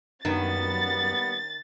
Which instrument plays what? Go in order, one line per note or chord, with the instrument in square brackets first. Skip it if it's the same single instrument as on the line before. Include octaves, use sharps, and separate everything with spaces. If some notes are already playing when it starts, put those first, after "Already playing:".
[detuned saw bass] F#2 [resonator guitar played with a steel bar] D#3 [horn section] G3 A#3 B3 [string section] A6